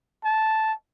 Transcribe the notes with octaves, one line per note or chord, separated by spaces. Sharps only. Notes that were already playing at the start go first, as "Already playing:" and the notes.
A5